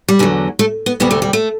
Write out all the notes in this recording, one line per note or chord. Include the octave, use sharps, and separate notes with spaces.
G3
E2 D3 F#3
A3
B3
D2 C3 G3 B3
A3
G3
A3